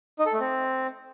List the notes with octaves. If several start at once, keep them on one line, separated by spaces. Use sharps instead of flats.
D#4
A4
A3
C4